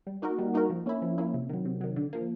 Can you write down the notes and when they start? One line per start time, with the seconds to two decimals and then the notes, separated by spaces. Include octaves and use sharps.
0.07 G3
0.22 A#3 D#4 F#4 A#4
0.39 G3
0.54 A#3 D#4 F#4 A#4
0.70 F3
0.86 A#3 C#4 E4
1.02 F3
1.18 A#3 C#4 E4
1.34 C3
1.49 D#3 F#3
1.65 C3
1.81 D#3 F#3
1.96 D3
2.13 F3 A#3